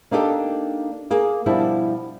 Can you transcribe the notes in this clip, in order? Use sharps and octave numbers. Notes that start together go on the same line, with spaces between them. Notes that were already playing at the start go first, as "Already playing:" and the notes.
A#3 D4 D#4 G4 A4
A#3 G#4
B2 F3 G3 D4 E4